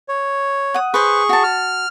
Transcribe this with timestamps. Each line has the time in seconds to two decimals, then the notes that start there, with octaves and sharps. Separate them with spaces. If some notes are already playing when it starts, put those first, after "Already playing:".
0.08 C#5
0.74 F#5 D#6
0.94 G#4 B4 C5 C#6
1.29 F#4 A5
1.44 F6